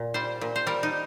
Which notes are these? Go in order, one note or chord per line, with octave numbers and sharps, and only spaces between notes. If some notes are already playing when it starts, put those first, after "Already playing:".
Already playing: A#2
G3 C5
A#2
C5
G3 A#4
D#4